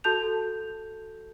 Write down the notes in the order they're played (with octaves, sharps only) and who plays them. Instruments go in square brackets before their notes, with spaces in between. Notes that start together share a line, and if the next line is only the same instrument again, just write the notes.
[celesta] F#4 A4 A5 G6 F7